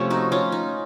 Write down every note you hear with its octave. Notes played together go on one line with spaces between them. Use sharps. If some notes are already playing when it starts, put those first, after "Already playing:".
Already playing: C3 F3 A3 C#4 C#5
D#4 F#4
C#4 F4
D#4